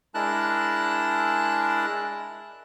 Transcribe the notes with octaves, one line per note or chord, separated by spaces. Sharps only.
G#3 D4 E4 A#4 A5 F#6